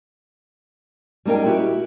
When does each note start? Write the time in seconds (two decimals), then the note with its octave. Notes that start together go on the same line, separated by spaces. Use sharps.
1.25 G3 G#3 D#4 A#4 G5
1.45 E4 F#4 G4